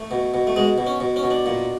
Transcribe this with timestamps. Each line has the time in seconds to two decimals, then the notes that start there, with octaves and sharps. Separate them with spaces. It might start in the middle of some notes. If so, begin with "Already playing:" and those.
Already playing: A3
0.11 B2
0.34 B2
0.47 A3
0.56 B2 G#3
0.78 B2
0.87 C#4
1.00 B2
1.16 C#4
1.23 B2
1.30 D4
1.46 A#2